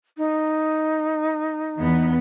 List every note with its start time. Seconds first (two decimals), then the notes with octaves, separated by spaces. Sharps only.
0.18 D#4
1.78 E2 B3